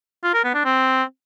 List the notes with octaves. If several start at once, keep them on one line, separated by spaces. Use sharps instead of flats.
F4
A#4
B3
D4
C4